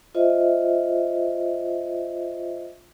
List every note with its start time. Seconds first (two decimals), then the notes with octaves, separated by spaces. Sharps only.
0.15 F4 C5 D#5 E5